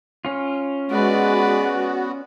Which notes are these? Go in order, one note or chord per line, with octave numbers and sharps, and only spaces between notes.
C#4 F4
G#3 B3 F#4 B4 D5